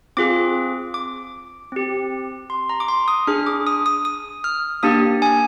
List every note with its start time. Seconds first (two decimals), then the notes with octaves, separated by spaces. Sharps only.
0.17 C4 F4 G#4 D6
0.94 D6
1.72 C4 G4
2.50 C6
2.69 A#5
2.80 D6
2.88 C6
3.08 D#6
3.27 D4 G#4 F6
3.46 D6
3.67 D#6
3.86 D#6
4.05 D#6
4.44 F6
4.83 A#3 D4 G4 D#6
5.22 G#5